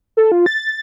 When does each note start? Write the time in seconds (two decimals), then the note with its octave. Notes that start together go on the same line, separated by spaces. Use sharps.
0.17 A4
0.32 F4
0.46 A6